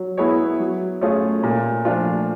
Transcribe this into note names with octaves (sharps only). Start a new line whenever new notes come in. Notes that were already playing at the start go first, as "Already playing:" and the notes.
Already playing: F#3
B3 E4 G#4 C#5
F#3
A3 C#4 F4 G#4
A#2
F3 A3 D4 F4